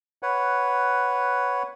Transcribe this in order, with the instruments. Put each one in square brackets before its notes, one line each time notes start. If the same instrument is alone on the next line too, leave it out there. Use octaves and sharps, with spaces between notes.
[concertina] B4 C#5 F#5